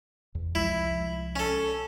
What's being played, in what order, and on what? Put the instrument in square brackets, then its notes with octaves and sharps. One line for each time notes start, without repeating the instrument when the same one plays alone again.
[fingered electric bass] E2
[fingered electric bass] C2 F3 G#3 [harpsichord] E4
[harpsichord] C#4 A4